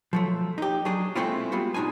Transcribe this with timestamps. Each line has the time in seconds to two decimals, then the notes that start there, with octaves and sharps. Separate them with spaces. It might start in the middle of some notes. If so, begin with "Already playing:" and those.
0.13 F3 F#3 A3
0.58 D#4 G4
0.85 F#3 D4 G#4
1.16 G#3 A3 C4 E4 F4
1.52 G3 B3 F4 F#4
1.74 B2 D4 D#4 F4 G#5